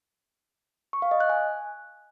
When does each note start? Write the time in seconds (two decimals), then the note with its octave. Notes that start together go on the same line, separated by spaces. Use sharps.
0.93 C#6
1.02 F5
1.11 D#5
1.20 F#6
1.30 G#5